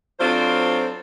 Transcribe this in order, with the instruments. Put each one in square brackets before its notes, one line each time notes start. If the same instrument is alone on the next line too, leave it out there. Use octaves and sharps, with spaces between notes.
[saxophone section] F#3 C4 D4 F4 A4 C5